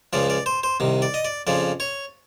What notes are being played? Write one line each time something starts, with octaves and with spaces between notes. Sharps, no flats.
C#2 C#3 F3 D5
D5
C5
C5
C2 C3 D#3
D5
D#5
D5
F2 C#3 F3 D5
C#5